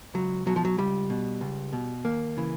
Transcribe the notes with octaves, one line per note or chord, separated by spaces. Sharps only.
C#2 F#3
B2 F#3
F3
F#3
C#2 G3
B2
C#2
B2
D#2 A#3
C#3 E3